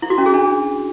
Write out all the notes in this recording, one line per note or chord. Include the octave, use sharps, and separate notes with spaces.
E4
F#4
C#4
G#4
D4